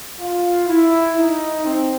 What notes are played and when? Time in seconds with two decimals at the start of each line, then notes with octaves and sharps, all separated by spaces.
0.20 F4
0.68 E4
1.17 D#4
1.65 C4